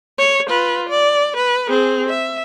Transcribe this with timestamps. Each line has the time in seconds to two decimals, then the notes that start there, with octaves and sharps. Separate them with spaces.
0.19 C#5
0.49 F4 B4
0.90 D5
1.37 B4
1.69 C4 G#4
2.10 E5